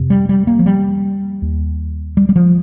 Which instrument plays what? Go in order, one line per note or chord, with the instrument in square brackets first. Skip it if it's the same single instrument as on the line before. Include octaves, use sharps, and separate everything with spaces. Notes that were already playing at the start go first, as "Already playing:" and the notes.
Already playing: [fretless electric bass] F2 C3
G3
G3
A#3
F3
G3
D#2
G3
G3
F3